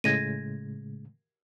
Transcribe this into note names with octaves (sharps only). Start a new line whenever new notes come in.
A2 C#3 G#3 G#6 A#6 D#7